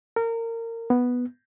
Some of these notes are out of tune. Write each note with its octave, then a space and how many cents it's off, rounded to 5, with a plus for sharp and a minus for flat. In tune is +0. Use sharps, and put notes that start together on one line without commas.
A#4 -25
B3 +0